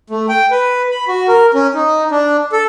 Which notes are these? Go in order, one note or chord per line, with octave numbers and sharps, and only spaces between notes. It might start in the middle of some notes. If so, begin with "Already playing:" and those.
A3
G5
B4
B5
F#4
A#4
C#4
D#4
D4
A4